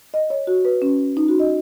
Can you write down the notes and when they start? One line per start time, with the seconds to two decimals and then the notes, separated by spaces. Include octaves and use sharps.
0.14 D#5
0.30 C#5
0.47 F#4
0.65 B4
0.82 C#4
1.17 D#4
1.28 F#4
1.40 D#5